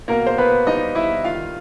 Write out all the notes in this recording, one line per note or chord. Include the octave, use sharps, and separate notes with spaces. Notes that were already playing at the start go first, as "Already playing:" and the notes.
B2 A#3 A#4
C5
B2 B3 B4
G3 D#4 D#5
G3 E4 E5
D#3 F4 F5